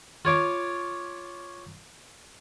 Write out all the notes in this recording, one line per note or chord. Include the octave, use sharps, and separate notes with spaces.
F4 C#5 D6